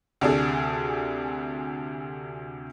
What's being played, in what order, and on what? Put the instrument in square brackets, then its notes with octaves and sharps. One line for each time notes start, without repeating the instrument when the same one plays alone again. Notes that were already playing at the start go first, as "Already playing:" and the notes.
[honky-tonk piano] D2 C3 D4 G#4 A4